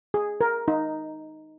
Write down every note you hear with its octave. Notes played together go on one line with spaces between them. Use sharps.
G#4
A#4
D#4